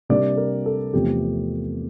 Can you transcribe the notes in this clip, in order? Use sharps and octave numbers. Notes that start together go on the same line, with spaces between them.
C3 G3 A#3 D4 D5
A#4
A4
E2 C3 F3 A3 C4 G4